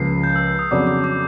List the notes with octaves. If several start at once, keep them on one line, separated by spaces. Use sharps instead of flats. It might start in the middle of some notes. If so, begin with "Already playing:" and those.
Already playing: C#2 C#3 F3 A#3 C7
G6
E6
E6
D#6
F2 C#3 F#3 B3 D4 D6
D6
D6